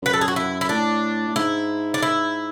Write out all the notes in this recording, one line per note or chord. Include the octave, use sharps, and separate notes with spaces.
F#2 B4
A4
G#4
F#4
E4
E4
A2 D4
A2
G#2 E4
D4
E4